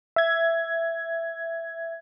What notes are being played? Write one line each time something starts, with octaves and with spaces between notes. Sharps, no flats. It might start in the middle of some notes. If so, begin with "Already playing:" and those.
E5 G#6